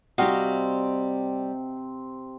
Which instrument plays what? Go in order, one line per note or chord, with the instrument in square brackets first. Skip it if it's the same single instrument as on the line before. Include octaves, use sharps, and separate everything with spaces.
[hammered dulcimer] C3 C4 [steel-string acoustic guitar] G3 G4 [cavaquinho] F#4 D#5 F5